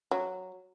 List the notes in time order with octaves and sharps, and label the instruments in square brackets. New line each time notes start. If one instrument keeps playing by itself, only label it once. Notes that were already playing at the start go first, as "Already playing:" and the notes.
[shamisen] F#3